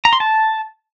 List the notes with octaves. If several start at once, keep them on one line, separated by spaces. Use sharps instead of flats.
A#5
C6
A5